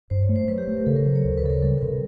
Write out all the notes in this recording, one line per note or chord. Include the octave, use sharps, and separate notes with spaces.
G2 C5
C#5
A3
C5
F#3 B4
G4
A3
A#4
C#3 A4
A#4
F#3 C5
C#5
D2
B4
C#3 A4
A#4
G3 A4
A#4
C3 B4